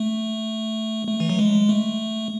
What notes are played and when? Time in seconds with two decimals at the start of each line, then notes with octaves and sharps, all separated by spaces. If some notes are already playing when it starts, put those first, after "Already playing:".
Already playing: A3
1.07 A3
1.20 E3
1.29 F#3
1.39 G#3
1.69 A3